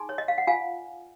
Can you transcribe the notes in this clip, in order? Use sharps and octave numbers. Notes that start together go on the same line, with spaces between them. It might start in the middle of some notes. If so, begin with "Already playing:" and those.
Already playing: D#4 G#4 G#5 C6
C#5
D#5
F5
F#5
F4 F5 G#5